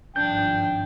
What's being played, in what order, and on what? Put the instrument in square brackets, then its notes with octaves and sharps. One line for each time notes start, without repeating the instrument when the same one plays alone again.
[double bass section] G#1 G2 F3 [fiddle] D4 [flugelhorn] G5 [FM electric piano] G6